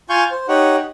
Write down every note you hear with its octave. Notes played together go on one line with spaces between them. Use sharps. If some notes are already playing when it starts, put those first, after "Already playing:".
F4 F5 G#5 C6 C#6 G6
C5
D#4 G4 C#5 F#5